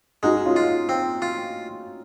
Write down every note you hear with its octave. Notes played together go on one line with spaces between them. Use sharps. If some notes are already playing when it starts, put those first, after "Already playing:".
G#3 D#4 F#4
C#4 F4
F4
C4
F4